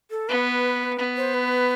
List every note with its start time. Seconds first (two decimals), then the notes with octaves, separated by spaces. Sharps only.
0.11 A4
0.29 B3 B4
0.99 B3
1.17 C5
1.34 B4